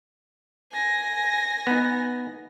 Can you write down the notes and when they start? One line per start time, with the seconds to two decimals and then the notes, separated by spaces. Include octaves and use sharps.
0.72 G#5 A#6
1.67 B3 D#4